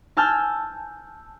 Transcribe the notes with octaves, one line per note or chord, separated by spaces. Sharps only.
G#5 A5 E6 F6 G6